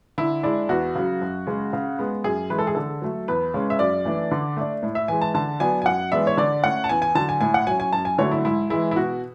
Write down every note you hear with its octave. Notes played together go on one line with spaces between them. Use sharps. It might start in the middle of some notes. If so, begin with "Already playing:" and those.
D3 E4
G#3 D4 E4
E2 F#4
C#3 F#3
F#2
C#3 G#3
C#3
G#3 B3
F#2 G#4
E3 G#3 B4
A4
G#4
D3 A4
F#3 A3
E2 B4
C#3 G#3 C#4
E5
F#2 D5
E3 A3 D4
D3
A3 D4
A2
E5
E3 G#3 G#5
A5
D3 A5
F#3 B3 D4 G#5
G#5
F#2 F#5
E3 G#3 B3 D4 E5
C#5
D3 D5
A3 C#4 F#5
A5
E2 G#5
G#5
D3 F#3 A5
G#5
A2 G#5
F#5
F#3 C#4 G#5
G#5
F#2 A5
G#5
D3 F#3 A3 C#5
E4
G#2 E4
E3 G#3 E4
E4
B2 F#4